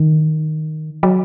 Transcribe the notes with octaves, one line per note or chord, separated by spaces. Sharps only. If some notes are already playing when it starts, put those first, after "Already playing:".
Already playing: D#3
F#3